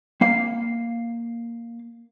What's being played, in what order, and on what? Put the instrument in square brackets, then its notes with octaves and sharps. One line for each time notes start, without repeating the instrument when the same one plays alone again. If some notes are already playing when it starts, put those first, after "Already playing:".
[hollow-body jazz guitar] A#3 F5